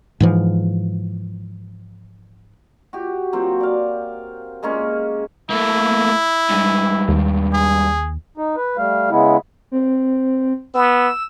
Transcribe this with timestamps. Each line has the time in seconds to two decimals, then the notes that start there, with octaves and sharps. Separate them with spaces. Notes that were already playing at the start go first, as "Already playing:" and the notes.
0.20 G#2 E3 F3
2.93 F#4 G4
3.33 F#3 A#3 C4
3.60 D5 F5
4.63 G#3 A#3 C#4 C#6
5.50 A3 A#3 E4
6.50 G2 G#3
7.08 D#2
7.54 G#4
8.37 D#4
8.56 B4
8.77 G3 A3 F5
9.10 C#3 G#3 B3 E4
9.72 C4
10.74 B3 E6